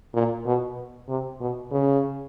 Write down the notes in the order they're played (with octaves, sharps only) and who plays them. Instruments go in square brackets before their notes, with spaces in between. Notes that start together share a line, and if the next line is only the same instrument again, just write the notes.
[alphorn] A#2
B2
C3
B2
C#3